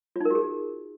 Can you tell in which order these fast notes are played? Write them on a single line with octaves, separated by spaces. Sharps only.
F4 D#4 A#4 F#4 G#4